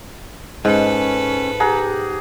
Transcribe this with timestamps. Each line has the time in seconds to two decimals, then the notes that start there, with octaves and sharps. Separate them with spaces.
0.65 G#2 C#4 A4 B4
1.60 G4 G#4 F#5 A#5